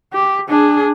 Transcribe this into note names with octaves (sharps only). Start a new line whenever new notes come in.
G4
D4 G#4